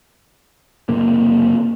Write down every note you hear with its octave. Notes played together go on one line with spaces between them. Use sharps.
F#1 C3 A#3